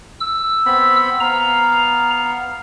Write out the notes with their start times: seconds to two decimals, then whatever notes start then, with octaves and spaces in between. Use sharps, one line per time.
0.20 E6
0.66 B3 C4 B5
1.20 B3 F5 A#5